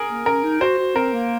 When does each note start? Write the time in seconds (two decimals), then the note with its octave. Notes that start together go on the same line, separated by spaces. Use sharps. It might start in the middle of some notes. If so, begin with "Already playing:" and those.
Already playing: G#4 A#4
0.08 A#3
0.26 C#4 A#4
0.43 D#4
0.61 F#4 C5
0.78 F#4
0.95 C4 A#4
1.13 A#3